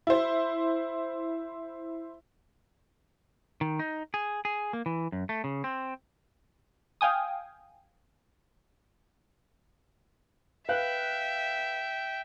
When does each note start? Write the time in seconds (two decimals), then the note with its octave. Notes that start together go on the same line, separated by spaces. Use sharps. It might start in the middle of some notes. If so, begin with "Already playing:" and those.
0.07 E4 C5
3.61 D#3
3.79 D#4
4.14 G#4
4.45 G#4
4.73 A#3
4.86 E3
5.12 F#2
5.29 A3
5.44 C#3
5.64 C4
7.01 F5 G5 G#5 D#6
10.69 B4 E5 F5 G5 F#6